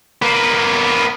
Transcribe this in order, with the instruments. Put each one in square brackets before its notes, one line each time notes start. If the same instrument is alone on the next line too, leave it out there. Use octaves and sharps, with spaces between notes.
[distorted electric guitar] A#3 B3